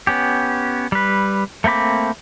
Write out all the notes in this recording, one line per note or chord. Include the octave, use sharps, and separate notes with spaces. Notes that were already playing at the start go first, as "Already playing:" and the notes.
B3 C#4 G4
G3 B4
A3 A#3 C4 B5 D6